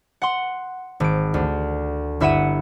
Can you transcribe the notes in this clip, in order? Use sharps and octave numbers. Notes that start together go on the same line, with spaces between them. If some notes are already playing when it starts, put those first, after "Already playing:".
F#5 C6
G#1 D7
D2
G1 E4 E5 F#5 D#7 E7